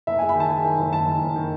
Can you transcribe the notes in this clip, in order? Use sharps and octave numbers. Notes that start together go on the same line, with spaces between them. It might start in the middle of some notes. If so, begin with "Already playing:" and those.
F#1 E5
G#3 G#5
B5
D#3 A5
G#3 G#5
D#3
F#1
D#3 A5
D#3
F#1
D#3